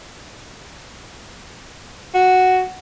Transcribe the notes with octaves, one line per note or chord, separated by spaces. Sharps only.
F#4